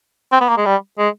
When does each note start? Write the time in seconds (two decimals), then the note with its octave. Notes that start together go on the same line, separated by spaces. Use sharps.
0.32 C4
0.40 B3
0.48 A#3
0.57 G#3
0.66 G3
0.98 G#3